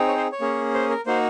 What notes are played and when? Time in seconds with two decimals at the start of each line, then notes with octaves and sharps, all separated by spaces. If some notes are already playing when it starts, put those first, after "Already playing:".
Already playing: C4 D#4 G#4
0.08 C#5
0.17 C5
0.32 C#5
0.41 A#3 C#4 G#4
0.74 C5
0.90 A#4
1.06 A#3 D#4 F#4 C5